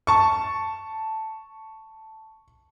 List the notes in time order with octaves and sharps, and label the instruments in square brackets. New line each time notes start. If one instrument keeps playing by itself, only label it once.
[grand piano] A5 C#6